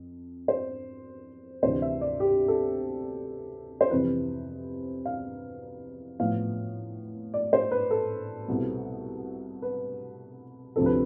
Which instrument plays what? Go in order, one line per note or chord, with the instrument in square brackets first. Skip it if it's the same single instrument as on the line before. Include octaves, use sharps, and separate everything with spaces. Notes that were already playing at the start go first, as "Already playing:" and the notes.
Already playing: [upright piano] F2
C5
D2 C3 E3 C5
E5
D5
G4
A4
C5
F2 C3 E3 B4
F5
A2 F3 B3 F5
D5
C5
B4
A4
C2 B2 B3
B4
D2 C3 F3 C4 A4
B4